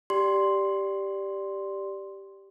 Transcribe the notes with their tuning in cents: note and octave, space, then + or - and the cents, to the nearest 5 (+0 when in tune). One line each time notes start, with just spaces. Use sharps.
G4 +0 D5 +0 C6 +0